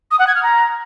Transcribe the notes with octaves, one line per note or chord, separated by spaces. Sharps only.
D#6
F#5
G#6
F6
A#5